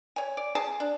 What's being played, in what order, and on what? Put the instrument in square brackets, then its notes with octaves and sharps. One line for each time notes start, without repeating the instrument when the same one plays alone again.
[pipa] C#5 G#5
D5
G#4 G#5 A5
D4